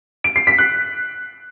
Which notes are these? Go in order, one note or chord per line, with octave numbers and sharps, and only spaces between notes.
D7
C7
B6
F#6